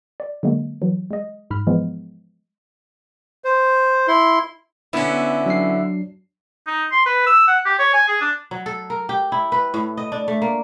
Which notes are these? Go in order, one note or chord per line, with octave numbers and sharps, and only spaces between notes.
D5
D3 F#3 G#3 A#3
E3 F#3
G#3 D#5
G#2 B5 F6
E3 F3 G#3 B3
C5
E4 C6
D3 B3 C#4 E4
F#3 D4 C7
D#4
C6
B4
E6
F#5
G4
C#5
G#5
G#4
D4
F#3
A4
A#4
G4
E4
B4
A2
D#5
D4
A3
A#3